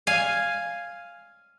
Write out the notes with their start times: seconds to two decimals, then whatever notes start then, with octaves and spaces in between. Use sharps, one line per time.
0.07 F5 G#5